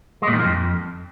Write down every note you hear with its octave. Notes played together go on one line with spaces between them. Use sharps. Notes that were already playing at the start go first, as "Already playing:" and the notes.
G#3
A#2
D#3
F3
F2